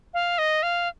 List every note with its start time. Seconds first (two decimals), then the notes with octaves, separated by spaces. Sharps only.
0.14 F5
0.38 D#5
0.63 F5